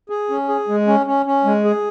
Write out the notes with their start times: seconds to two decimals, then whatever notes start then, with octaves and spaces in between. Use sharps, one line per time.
0.10 G#4
0.30 C#4
0.49 G#4
0.68 G#3
0.87 C#4
1.06 C#4
1.26 C#4
1.45 G#3
1.65 G#4